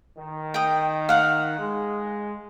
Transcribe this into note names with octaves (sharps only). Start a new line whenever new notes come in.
D#3
G5 D#6
F5 F#5
G#3